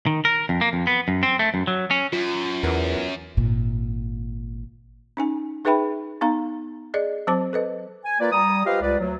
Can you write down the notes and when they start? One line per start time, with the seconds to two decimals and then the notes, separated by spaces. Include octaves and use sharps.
0.06 D#3
0.25 A#4
0.49 F2
0.61 A#3
0.73 F2
0.87 B3
1.08 F#2
1.23 C4
1.39 A3
1.54 F#2
1.67 F#3
1.91 C#4
2.13 F#2 F4
2.63 E2 E3 B3 A#4
3.37 G#1 A#2
5.17 C#4 D#4 G#5
5.65 D#4 G#4 B4 E5 G5 B5
6.21 B3 D#4 F5 A#5
6.94 G#4 D5 D#5
7.27 F#3 C4 C5 A5 D6
7.53 A4 B4 D#5
8.05 G#5
8.20 A#3 F4 A#4 B4 D5
8.32 G3 A#5 D#6
8.66 F4 G4 B4 C5 D#5 F5
8.82 C#2 B4 D5
8.99 D2 F#3